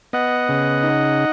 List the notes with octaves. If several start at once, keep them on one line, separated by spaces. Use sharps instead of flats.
B3 D#5 F#5
C#3
D#4